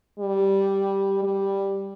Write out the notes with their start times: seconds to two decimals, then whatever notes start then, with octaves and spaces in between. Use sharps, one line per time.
0.19 G3
1.23 G3